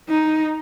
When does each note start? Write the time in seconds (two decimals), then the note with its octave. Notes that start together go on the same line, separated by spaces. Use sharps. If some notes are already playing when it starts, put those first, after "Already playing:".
0.09 D#4